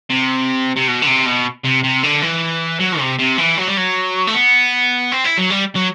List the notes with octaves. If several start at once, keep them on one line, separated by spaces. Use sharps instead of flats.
C3
C3
B2
D3
C3
B2
C3
C3
D3
E3
F#3
C3
C3
E3
F#3
G3
F#3
A3
B3
C4
E4
F#3
G3
F#3